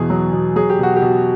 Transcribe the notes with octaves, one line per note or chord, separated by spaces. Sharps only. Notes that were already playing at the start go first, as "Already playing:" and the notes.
Already playing: E2 B2 G#4
F#3
B2
F#3 G#4
G4
B2 F#4
G4
B2